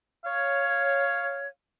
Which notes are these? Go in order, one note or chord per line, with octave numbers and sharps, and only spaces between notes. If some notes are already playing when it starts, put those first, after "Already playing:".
C#5 F5